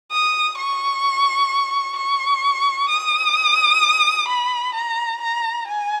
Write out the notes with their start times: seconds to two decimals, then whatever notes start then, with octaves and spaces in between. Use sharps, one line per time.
0.11 D#6
0.58 C#6
1.97 C#6
2.90 D#6
4.28 B5
4.75 A#5
5.21 A#5
5.68 G#5